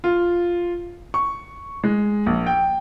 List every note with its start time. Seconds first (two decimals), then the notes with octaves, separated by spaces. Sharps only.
0.04 F4
1.14 C#6
1.84 G#3
2.26 A#1
2.46 G5